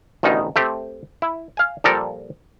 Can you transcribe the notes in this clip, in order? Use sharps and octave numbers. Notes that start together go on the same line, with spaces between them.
A1 D2 B2 D#3 D#4
A3 C4 G4
E4
F5 G#5
A#2 F3 G3 A4 A#4